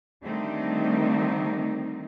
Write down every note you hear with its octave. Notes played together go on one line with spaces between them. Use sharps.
D3 D#3 G3 A3 C4 D#4